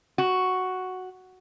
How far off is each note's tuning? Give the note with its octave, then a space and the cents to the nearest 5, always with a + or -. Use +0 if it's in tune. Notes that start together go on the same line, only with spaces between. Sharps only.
F#4 +0